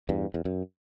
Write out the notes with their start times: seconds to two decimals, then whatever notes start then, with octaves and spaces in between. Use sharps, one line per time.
0.09 E2 G2
0.34 E2
0.45 F#2